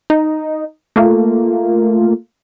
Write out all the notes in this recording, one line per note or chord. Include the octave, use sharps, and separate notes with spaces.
D#4
A3 A#3 F4